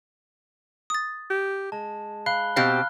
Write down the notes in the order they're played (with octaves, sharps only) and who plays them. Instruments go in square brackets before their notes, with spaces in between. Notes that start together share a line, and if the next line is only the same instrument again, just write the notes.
[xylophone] D#6 A6
[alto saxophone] G4
[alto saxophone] G#3 [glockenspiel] A5
[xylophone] F5 [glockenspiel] B5 F#6 G7
[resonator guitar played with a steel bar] B2 C4 G4 [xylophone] F5 [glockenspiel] F6 F#6